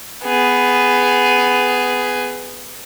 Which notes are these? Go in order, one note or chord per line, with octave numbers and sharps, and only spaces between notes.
B3 G#4